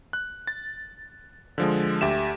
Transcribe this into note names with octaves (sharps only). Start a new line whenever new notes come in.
F#6
A6
D3 F3 G#3
D2 G4 E5 E7